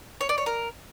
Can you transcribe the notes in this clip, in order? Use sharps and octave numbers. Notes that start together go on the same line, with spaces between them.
C#5
D5
C#5
A#4